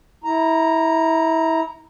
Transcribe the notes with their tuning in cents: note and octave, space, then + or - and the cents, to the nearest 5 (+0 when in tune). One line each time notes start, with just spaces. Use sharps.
E4 -25 A#5 +0